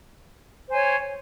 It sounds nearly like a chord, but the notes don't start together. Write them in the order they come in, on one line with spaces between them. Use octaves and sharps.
C5 G#5 C#5